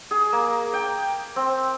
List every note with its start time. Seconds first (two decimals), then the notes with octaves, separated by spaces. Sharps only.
0.11 G#4
0.32 A#3
0.73 G5
1.36 C4